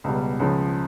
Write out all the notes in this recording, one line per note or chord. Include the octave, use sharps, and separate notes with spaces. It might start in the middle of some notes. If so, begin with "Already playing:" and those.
C#2 B2 G3
C#2 C#3 F3